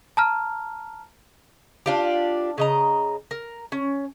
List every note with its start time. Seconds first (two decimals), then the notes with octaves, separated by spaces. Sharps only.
0.17 A5 A#5 F6
1.86 D4 F4 G4
2.58 C#3 D#5 A#5
3.31 A#4
3.72 C#4